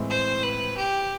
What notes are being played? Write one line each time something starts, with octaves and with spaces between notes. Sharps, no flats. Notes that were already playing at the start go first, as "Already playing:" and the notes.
Already playing: A2 E3 G#3 C4
C5
B4
G4